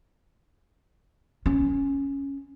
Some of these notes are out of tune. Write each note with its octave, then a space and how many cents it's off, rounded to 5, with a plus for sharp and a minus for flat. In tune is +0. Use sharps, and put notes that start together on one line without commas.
C#4 +0